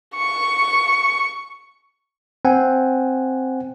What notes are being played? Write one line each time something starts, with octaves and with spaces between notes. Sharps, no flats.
C#6
C4 F#5 G#5